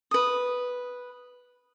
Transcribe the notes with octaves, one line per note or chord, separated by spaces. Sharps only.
B4 D#6